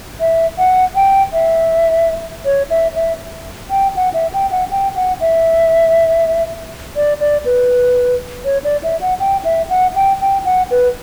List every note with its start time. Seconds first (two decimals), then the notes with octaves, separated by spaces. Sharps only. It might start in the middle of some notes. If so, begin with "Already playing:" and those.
0.20 E5
0.58 F#5
0.96 G5
1.33 E5
2.45 C#5
2.70 E5
2.95 E5
3.70 G5
3.96 F#5
4.14 E5
4.34 G5
4.51 F#5
4.71 G5
4.96 F#5
5.21 E5
6.96 D5
7.20 D5
7.45 B4
8.45 C#5
8.64 D5
8.83 E5
9.01 F#5
9.20 G5
9.45 E5
9.70 F#5
9.96 G5
10.21 G5
10.45 F#5
10.71 B4